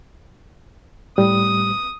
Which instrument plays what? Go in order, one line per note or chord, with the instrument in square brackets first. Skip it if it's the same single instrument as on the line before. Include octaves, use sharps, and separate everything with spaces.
[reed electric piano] A2 G3 [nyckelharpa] D#6